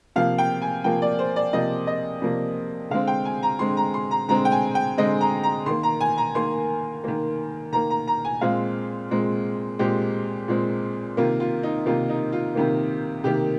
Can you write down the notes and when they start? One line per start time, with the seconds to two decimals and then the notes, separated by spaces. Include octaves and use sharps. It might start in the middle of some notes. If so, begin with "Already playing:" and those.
0.16 C3 F3 A#3 F5
0.38 G5
0.62 G#5
0.84 C3 F3 A#3 G5
1.02 D5
1.19 C5
1.36 D5
1.53 C3 F3 A#3 D#5
1.87 D#5
2.22 C3 F3 A#3
2.90 D3 G#3 C4 F5
3.07 G5
3.25 G#5
3.43 A#5
3.59 D3 G#3 C4 C6
3.77 A#5
3.94 C6
4.11 A#5
4.29 D3 G#3 C4 A#5
4.45 G5
4.52 G#5
4.75 G5
4.97 D3 G#3 C4 D#5
5.21 A#5
5.43 A#5
5.66 D#3 A#3 C6
5.83 A#5
6.01 G#5
6.18 A#5
6.35 D#3 A#3 C6
7.04 D#3 A#3
7.73 D#3 A#3 A#5
7.90 A#5
8.07 A#5
8.25 G#5
8.41 A#2 G#3 C4 F5
9.11 A#2 G#3 C4
9.79 A#2 G#3 C4 G4
10.48 A#2 G#3 C4
11.17 C3 D#3 A#3 F4
11.40 F4
11.63 D#4
11.86 C3 D#3 A#3 F4
12.09 D#4
12.32 F4
12.55 C3 D#3 A#3
13.24 C3 D#3 A#3 G4